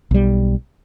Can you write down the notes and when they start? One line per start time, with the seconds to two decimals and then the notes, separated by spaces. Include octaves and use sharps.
0.11 B1 G3